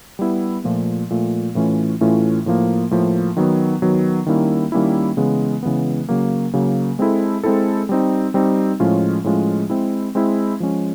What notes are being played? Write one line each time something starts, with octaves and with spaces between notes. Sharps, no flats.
G3 B3 E4 G4
A#2 F3 A3
A#2 F3 A3
A2 E3 A3 C#4 F4
A2 E3 A3 C#4 F4
A2 F3 A#3
A2 F3 A#3
D#3 F#3 B3
D#3 F#3 B3
D#3 G3 A#3 C#4 E4
D#3 G3 A#3 C#4 E4
C#3 E3 G#3 B3
C#3 E3 G#3 B3
C#3 F#3 A#3
C#3 F#3 A#3
G#3 C4 E4 A4
G#3 C4 E4 A4
G3 C4 D#4
G3 C4 D#4
A2 F3 G#3 C#4 F4
A2 F3 G#3 C#4 F4
G#3 C4 E4
G#3 C4 E4
F3 G#3 C#4